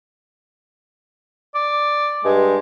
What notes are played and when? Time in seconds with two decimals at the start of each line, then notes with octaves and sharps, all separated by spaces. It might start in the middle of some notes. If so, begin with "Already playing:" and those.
1.55 D5
2.25 G2 G#3